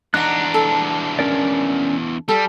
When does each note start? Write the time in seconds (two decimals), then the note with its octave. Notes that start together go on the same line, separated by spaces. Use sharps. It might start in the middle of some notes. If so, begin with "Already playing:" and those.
0.14 E2 D4 D#4 F#5 A#5 F#6
0.54 A4
1.19 C#4 A#4 D5
2.29 G3 A4